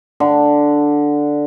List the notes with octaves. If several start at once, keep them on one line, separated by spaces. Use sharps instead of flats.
D3